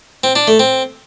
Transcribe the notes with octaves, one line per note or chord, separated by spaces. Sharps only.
C4
D4
A3
C4